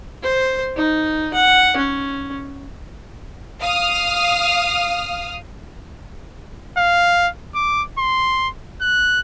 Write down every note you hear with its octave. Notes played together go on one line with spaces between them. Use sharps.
C5
D#4
F#5
C#4
F5 D#6 F6
F5
D6
C6
F#6